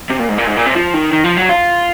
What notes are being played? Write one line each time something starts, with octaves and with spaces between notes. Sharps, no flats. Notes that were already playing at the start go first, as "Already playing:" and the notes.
C3
A#2
G#2
A#2
G#2
A#2
C3
F3
D#3
D#3
F3
F#3
F4